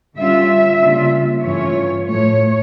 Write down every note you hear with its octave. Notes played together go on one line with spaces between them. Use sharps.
D3 G3 C#4 F4 E5
C#3 G3 A#3 D4 F4
G2 E3 A3 C#4 F4 C#5
A2 F3 A3 C#5